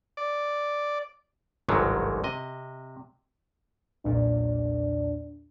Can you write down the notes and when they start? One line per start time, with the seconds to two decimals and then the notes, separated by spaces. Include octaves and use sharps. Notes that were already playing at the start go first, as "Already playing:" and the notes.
0.17 D5
1.69 G1 C2 G#2 D3 D#3 F#3
2.24 C3 D#5
4.05 B1 E2 A#2 D4